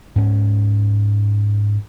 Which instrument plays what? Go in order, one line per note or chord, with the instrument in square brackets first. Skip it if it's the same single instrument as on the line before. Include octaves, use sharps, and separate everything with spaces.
[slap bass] G#2 C#4